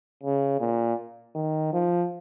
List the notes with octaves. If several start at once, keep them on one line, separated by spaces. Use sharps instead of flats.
C#3
A#2
D#3
F3